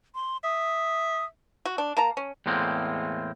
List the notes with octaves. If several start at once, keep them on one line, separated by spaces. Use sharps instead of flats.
C6
E5 D#6
F#4
D4
A#3 A5 A#5
C#4
E2 A2 G#3 A#3 C4